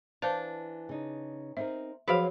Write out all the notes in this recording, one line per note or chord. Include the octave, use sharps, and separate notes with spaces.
E3 D4 C5 F5 A5
C#3 D#4
C4 D#4 A#4 E5
F3 F#3 F#4 G#4 B4 C5 F5